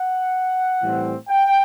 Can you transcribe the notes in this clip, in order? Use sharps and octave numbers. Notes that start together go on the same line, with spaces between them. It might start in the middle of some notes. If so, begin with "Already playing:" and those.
Already playing: F#5
A2 E3 G3 C4
G5